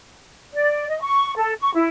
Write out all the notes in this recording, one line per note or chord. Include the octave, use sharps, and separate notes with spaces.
D5
D#5
C#6
A4
C#6
E4